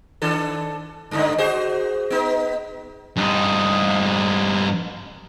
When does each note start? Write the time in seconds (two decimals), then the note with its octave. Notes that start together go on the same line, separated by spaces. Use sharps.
0.22 D#3 D4 A4
1.11 G2 D3 D#4
1.38 F#4 G#4 C5
2.10 B3 D#4
3.16 G2 D#4